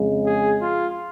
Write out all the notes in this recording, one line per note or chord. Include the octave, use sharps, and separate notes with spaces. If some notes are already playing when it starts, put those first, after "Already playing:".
Already playing: F2 C#3 G#3
G#4
F4